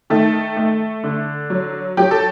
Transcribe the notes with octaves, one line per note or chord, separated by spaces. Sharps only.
D#3 A3 A4
A3
D3
F#3
F#3 G4
A4